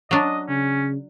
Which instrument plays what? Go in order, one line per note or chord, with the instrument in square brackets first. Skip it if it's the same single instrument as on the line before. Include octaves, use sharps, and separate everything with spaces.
[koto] F#3 D4 [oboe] D#5
[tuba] C#3 [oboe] C#4